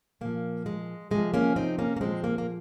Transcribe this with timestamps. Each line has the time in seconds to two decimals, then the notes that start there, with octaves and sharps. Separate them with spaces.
0.21 A#2 F3 A#3
0.66 G#3
1.11 C3 F3 G#3
1.34 A#3 C#4
1.56 C4 D#4
1.79 A#3 C#4
1.97 A#3
2.01 A#2 F3 G#3 C4
2.24 A#3
2.38 A#3